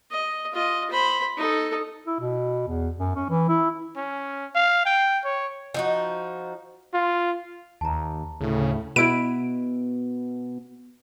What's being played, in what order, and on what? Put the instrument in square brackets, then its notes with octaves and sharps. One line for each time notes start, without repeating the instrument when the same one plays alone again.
[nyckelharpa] D#5
F4 D#5
C5 B5
D#4 A4
[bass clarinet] E4
B2
E2
F#2
C#4
E3
E4
[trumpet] C#4
F5
G5
C#5
[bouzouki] F3 D#4 F#4
[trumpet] F4
[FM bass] D#2 [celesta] A5 A#5
[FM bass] D2 [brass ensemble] A2 [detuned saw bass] C#3
[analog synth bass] B2 [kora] B3 E4 B4 [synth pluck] D7